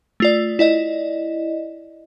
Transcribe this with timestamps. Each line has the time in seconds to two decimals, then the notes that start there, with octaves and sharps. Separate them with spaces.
0.20 A3 F4 D5
0.59 E4 D5 D#5